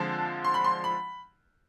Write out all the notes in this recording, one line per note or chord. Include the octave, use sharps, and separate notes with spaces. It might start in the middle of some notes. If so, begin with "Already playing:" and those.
Already playing: D3 F3 G#3 C4 A5
C6
B5
C6
B5